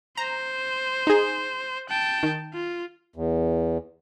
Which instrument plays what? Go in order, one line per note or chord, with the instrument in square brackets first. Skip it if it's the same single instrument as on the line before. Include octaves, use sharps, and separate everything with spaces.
[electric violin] C5 [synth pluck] A#5
[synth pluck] D#4 G#4
[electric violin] G5 A5
[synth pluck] D#3
[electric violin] F4
[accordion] E2